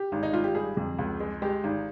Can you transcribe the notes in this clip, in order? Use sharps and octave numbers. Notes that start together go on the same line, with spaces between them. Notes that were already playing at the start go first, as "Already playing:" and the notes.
Already playing: G4
G#1
D#4
G#1 F4
G4
G3 G#4
F2
C#2
G#3
G#3 G4
G#1